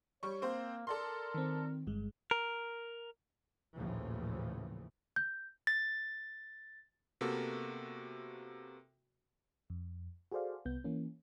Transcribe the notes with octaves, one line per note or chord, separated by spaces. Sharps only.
G3 C#5 C#6
A#3 C4 C5
A4 A#4 D5 C6
D#3 C4
G1 G2 G#3
A#4
A#1 D#2 A2 C#3 E3 F3
G6
A6
C3 A#3 B3 F#4 A4
F2
F#4 G#4 A4 C5 D5 F5
C2 B3 G6
E3 A#3 C#4